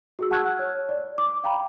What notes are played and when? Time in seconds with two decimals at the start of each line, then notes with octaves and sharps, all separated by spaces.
0.19 F#4 G#4 E6
0.31 F#5 A5 C#6 F6 F#6 G#6
0.59 C#5
0.89 D5
1.18 D6
1.44 F5 G5 A#5 B5